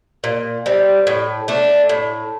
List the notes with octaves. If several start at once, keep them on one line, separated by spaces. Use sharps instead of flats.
A#2
G3 C4
A2
A3 D4
A2